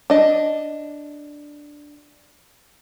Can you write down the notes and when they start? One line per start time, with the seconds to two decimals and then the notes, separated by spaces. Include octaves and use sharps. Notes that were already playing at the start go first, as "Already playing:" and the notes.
0.10 D4 D#5